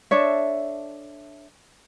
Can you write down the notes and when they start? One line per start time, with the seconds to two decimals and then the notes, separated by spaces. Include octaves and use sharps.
0.11 D4 A4 C#5 E5